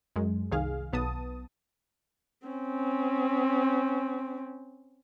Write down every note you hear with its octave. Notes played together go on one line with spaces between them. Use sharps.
F#2 G#3
C2 D#3 G#4 F5
B1 B3 A5 D#6
C4 C#4